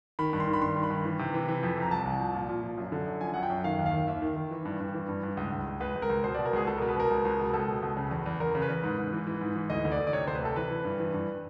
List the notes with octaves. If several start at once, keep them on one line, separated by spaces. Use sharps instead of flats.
D#3 B5
G2
C6
D#3
B5
G2 C6
D#3
B5
G2
E3
C3
E3
E3
F2
C3
A#5
C2 A5
C2
F3
A#2
A#2
F3
F#2
D3
F#2
F3 G#5
F#2 F#5
G5
F#2
D#3 F5
D#2
F5
D#3
D#2 E5
D#3
D#3
E3
G2
G2
E3
G2
G2
C#2
C#2
C#2
C#2 B4
C#2
A#4
C#2
B2 C5
B2 D5
A#4
C#2 G#4
C#2 A4
B2 A#4
B4
B2 A#4
C#2
C#2
B2
C#2 A4
B2
C#2
C#3
E2
E2
E2 A#4
C#3
B4
E2
G#2
G#2
E3
E3
G#2
E3
D2 D#5
D2
D5
D2
D5
C3 C#5
D2 C5
B4
C3 A4
E3 B4
E3
G2
E3
G2